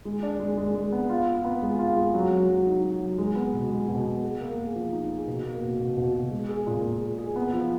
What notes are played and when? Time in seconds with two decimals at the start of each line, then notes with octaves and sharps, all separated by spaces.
0.05 G#3
0.23 D4
0.40 G#3
0.57 G#3
0.75 G#3
0.92 B3
1.09 F4
1.27 F4
1.45 B3
1.62 G#3
1.79 F4
1.97 G#3
2.14 F#3
2.31 F#3
2.49 F#3
2.67 D#4
2.83 F#3
3.01 F#3
3.18 G#3
3.35 B3
3.53 B2
3.71 G#3
3.88 B2
4.05 B3
4.23 G#4
4.40 A#3
4.58 G#4
4.75 F3
4.92 D#4
5.10 G#4
5.27 B2
5.45 A#3
5.62 B2
5.79 B2
5.97 B2
6.14 B2
6.31 G#3
6.48 G#4
6.67 A#2
6.83 A#2
7.01 G#4
7.18 G#4
7.36 B3
7.53 F3